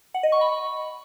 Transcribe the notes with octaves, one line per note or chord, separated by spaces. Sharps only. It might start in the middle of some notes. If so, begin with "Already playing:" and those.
F#5
D#5
C#6
B5